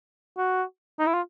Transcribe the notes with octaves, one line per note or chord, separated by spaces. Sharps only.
F#4
D#4
E4
F4